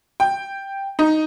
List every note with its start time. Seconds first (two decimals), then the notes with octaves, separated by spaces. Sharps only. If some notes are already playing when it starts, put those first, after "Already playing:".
0.20 G5
0.99 D#4